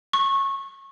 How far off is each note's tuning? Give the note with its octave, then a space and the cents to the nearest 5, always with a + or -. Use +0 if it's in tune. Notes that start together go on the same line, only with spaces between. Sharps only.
C#6 -20